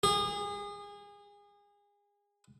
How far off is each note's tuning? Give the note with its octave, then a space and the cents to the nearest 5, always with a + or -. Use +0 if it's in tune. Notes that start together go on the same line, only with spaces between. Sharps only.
G#4 -30